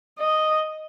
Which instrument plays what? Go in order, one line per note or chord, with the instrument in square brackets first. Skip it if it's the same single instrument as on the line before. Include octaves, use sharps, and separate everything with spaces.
[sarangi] D#5